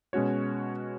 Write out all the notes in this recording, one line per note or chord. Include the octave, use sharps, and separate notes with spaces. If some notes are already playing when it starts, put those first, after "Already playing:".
B2 G#3 C#4 F#4 C#5